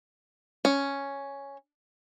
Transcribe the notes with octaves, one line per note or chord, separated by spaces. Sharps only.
C#4